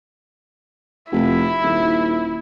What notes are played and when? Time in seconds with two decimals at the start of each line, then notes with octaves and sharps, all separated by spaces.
1.12 F1 E4
1.63 D#1